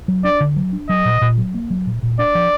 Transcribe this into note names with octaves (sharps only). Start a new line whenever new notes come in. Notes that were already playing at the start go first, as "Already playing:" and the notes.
F#3
D4 D5
D3
F#3
D4
F#3 D#5
A#2
A#2
F#3
A#3
F#3
A#2
A#2
D4 D5
F3